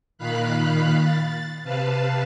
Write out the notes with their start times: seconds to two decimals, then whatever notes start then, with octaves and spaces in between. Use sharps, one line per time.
0.18 A#2 D#3 F5 B5 F#6
1.01 A6
1.64 C3 B4 F5 A5